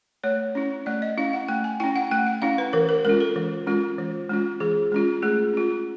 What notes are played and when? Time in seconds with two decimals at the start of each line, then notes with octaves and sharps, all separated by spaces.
0.24 A3 C#5
0.55 C#4 E4
0.86 A3 D5
1.02 D#5
1.17 C#4 E4 F5
1.33 F#5
1.48 A3 G5
1.64 G#5
1.80 C#4 E4 G5
1.96 F#5
2.11 A3 G5
2.27 F#5
2.42 C#4 E4 F5
2.58 B4
2.73 E3 A#4
2.89 A#4
3.05 G#3 C#4 F4 A#4
3.20 A4
3.36 E3
3.67 G#3 C#4 F4
3.98 E3
4.30 G#3 C#4 F4
4.60 E3 G#4
4.92 G#3 C#4 F4
5.22 A3 G#4
5.54 C#4 F4